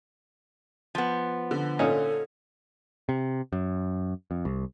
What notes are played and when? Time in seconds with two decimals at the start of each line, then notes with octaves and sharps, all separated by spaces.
0.95 F3 B3
1.51 D3
1.79 A#2 C#4 D#4 A4
3.09 C3
3.53 F#2
4.31 F2
4.45 C2